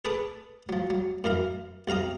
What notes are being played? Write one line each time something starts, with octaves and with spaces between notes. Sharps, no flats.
G#4 A4 B4 D6 D#6
F3 F#3
F#3
F#2 E3 A#4 F5
B1 C3 F5 A#5 D#6